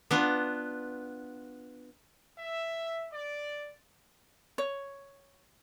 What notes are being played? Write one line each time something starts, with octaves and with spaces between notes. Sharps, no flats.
B3 D4 F4
E5
D5
C#5